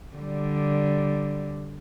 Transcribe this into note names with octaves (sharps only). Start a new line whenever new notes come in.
D3 G3